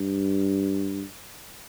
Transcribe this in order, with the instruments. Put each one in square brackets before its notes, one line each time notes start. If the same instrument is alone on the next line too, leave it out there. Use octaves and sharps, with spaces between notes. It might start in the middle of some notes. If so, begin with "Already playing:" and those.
Already playing: [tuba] G2